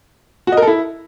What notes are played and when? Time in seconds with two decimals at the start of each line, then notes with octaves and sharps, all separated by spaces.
0.47 F#4
0.52 D#5
0.57 A#4
0.62 A4
0.67 E4